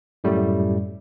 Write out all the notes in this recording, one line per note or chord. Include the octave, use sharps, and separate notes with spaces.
F#2 A2 G3 A3